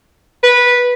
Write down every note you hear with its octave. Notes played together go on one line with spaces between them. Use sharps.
B4